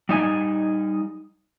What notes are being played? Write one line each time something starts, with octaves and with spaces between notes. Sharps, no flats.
G3 D#4 D#5 G#5